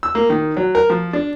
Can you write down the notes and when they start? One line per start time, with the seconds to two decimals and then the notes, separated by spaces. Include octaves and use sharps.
0.03 E6
0.15 A#3
0.30 D#3
0.57 F#3
0.75 A#4
0.90 F3
1.13 D4